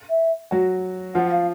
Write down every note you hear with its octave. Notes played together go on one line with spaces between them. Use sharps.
E5
F#3 F#4
F3 F4 F#5
F5